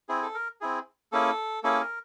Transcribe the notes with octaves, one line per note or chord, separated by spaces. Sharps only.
C4 E4 G#4
A4
A#4
C4 E4 G#4
A#3 C#4 E4 G#4 A4
A#3 C#4 E4 G#4 A4
A#4